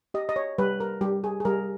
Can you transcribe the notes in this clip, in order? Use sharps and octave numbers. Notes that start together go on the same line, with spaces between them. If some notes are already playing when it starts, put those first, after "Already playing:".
G4 D#5
D#5
C#5
G3 B4
A#4
G3 G4
G#4
G#4
G3 A#4